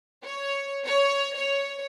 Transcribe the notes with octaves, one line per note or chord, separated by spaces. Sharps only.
C#5
C#5
C#5